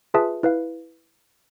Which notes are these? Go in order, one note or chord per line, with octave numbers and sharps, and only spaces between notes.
F4 G#4 B4 E5 A5
E4 B4 F5